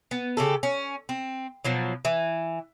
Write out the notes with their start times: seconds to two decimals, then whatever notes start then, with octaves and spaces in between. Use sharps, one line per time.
0.11 B3
0.37 C#3 G4 A4
0.63 C#4
1.09 C4
1.65 B2 F3 F#3
2.05 E3